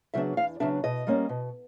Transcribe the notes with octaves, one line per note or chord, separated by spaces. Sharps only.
C#3 F#3 B3 D4 E5
E2 F5
C#3 F#3 B3 D4 E5
B2 D#5
G3 A#3 C#4
B2